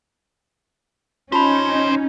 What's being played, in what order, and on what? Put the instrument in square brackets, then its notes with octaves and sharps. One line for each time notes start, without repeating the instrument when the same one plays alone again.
[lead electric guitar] D#3 C5 [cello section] C#4 D#4 [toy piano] F4 A5 B5